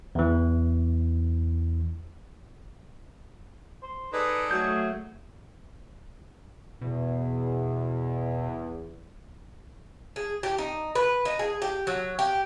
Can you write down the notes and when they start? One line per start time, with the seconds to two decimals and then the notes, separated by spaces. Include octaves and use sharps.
0.15 E2 E3
3.83 C5
4.13 D#4 G#4 A4 B4 D5
4.51 F#3 A3 G6
6.81 E2 B2
10.16 G#4
10.43 G4
10.58 D#4
10.95 B4
11.25 D#4
11.39 G#4
11.62 G4
11.87 F#3
12.19 G4